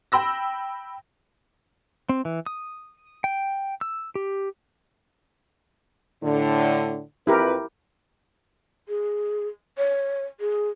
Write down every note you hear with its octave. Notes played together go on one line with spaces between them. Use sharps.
G5 B5 E6 A#6
C4
E3
D#6
G5
E6
G4
A2 D3
F2 E4 G4 A#4 B4
G#4
C#5
G#4